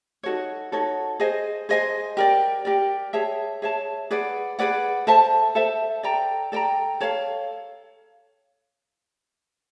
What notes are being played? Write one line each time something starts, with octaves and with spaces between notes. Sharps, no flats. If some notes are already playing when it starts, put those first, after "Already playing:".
D#4 F#4 A4 C#5
D#4 F#4 A4 C#5
G#4 C5 D#5 G#5
G#4 C5 D#5 G#5
G4 A#4 D5
G4 A#4 D5
G#4 C#5 E5 A5
G#4 C#5 E5 A5
G#4 B4 D5 F#5
G#4 B4 D5 F#5
A4 C5 E5 A5
A4 C5 E5 A5
A4 D5 G5 A#5
A4 D5 G5 A#5
A4 C#5 F5